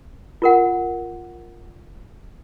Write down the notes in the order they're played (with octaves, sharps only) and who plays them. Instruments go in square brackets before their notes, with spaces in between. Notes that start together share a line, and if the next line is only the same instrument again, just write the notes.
[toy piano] F4 A#4 F#5